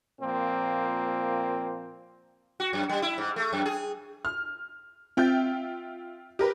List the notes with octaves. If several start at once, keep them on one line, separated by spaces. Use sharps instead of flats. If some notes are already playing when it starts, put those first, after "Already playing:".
A#2 F3 A#3 C4
F#4
F#2
G3
E4
G#2
A3
F#2
G#4
F6
C4 F4 E5 G5 G6 A6
G4 A#4 B4